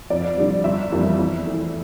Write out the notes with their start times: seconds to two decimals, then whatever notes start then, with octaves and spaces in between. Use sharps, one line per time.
0.10 F2 D5
0.37 D3 G3
0.64 G1 E5
0.92 F2 E3 G3 A#3
1.18 E2
1.47 E3 A3